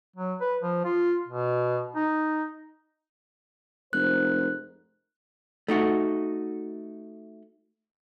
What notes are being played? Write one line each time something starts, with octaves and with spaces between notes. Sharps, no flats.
F#3
B4
F3
F4
B2
D#4
F1 G#2 A#4 C5 F#6
A3 D#4 F#4